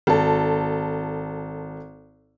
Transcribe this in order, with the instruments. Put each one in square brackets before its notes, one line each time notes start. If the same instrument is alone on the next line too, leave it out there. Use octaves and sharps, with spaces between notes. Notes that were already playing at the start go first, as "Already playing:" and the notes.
[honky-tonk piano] G#1 A4